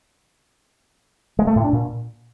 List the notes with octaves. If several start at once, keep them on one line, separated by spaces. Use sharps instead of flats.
G#3
A3
A2
D4
A#2